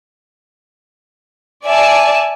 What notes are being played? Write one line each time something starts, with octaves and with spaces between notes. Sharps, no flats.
D5 E5 G#5 A5